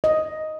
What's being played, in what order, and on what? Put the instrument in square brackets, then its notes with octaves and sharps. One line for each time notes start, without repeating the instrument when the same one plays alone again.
[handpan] D#5